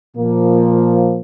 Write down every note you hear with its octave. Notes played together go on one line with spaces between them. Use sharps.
A#2 F3 A#3